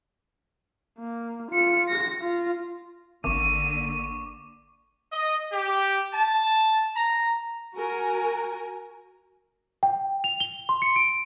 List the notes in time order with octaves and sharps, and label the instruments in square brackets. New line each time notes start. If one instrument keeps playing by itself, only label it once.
[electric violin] A#3
F4 C#7
A#6
F4
[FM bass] G#1 [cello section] D3 A#3 [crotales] C#6 D6 [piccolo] D#7
[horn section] D#5
G4
A5
A#5
[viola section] F#4 A#4 G#5
[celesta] G5
F7
G7
C6
C#7
D7